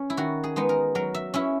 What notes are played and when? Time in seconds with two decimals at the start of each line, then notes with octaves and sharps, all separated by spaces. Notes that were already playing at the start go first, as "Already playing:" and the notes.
Already playing: C#4
0.10 E4
0.17 D#3 F#4
0.44 G#4
0.56 G#3 B3 D#4
0.69 A#4
0.95 F#3 A#4
1.14 E5
1.34 C#4 E4 E5